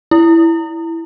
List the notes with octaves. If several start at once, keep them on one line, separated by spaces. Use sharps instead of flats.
E4